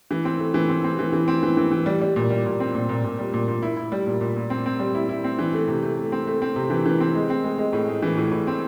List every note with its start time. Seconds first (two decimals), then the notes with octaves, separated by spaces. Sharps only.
0.11 E3
0.25 C4
0.39 A3
0.54 E3
0.69 C4
0.84 C4
0.99 E3
1.13 E3
1.28 C4
1.43 E3
1.57 E3
1.71 E3
1.86 G3
2.01 G3
2.16 A#2
2.30 G3
2.46 A#2
2.60 C4
2.75 A#2
2.89 A#2
3.04 A#2
3.19 G3
3.34 A#2
3.48 A#2
3.62 E4
3.77 E4
3.92 G3
4.06 A#2
4.21 A#2
4.36 A#2
4.50 C4
4.66 C4
4.79 G3
4.95 E4
5.09 E4
5.24 C4
5.39 E3
5.53 A3
5.68 C3
5.82 A3
5.98 A3
6.12 C4
6.27 A3
6.42 C4
6.56 C3
6.70 E3
6.86 E3
7.00 C4
7.15 G#3
7.30 C4
7.44 G#3
7.58 G#3
7.73 A2
7.88 G#3
8.02 E3
8.17 A2
8.31 A2
8.47 C4